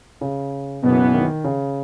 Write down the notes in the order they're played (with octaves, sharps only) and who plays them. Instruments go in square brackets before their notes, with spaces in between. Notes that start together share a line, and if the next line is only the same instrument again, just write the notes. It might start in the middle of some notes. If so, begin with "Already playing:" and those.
[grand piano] C#3
[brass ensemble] F#1 F#2 E3 B3 [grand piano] B2
[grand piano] D#3
C#3